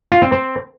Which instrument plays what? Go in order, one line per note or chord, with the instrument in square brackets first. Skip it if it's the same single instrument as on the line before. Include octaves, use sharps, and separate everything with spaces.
[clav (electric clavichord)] F4
C4
C4